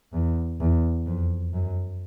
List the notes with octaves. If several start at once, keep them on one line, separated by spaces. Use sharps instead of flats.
E2
E2
F2
F#2